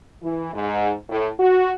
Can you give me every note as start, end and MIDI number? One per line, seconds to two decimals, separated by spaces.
0.23 0.51 52
0.54 0.92 44
1.09 1.29 45
1.40 1.74 66